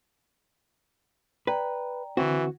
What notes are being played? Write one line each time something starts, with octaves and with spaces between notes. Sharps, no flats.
B4 D5 G5 A#5
D3 E3 C4 F#4